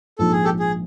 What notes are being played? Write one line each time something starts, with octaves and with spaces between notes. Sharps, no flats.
A#1 G#2 F3 A4
G#4
G4 A4
G#4